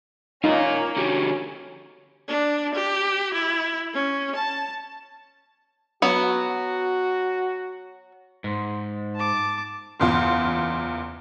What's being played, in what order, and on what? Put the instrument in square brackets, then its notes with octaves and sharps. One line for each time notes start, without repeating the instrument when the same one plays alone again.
[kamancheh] A#3 C#4 [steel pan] D#4 [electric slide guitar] F4 A#4 F5
[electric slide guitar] D3 F#4 G4 [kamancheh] C#4
[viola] D4
G4
E4
C#4
A5
[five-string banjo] F#3 B3 [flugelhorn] F#4
[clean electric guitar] G#2
[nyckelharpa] A5 D6
[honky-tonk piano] F#1 E2 F4